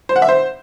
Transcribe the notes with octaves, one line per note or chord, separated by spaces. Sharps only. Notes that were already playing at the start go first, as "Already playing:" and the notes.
C5
F#5
E5
C5